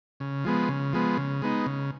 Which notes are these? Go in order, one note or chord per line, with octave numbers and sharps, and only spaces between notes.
C#3
F3 G#3 B3
C#3
F3 G#3 B3
C#3
G#3 B3 D#4
C#3